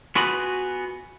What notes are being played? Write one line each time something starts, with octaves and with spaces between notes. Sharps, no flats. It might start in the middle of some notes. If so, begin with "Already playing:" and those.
B3 F4 F#4 G#4 B4 B5